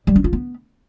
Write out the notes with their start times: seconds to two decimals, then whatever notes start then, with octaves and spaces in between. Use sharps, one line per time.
0.07 G3
0.16 C#4
0.24 F4
0.33 B3